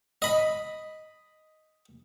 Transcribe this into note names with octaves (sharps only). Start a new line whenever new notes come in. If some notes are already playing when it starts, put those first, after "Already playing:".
D#5 B5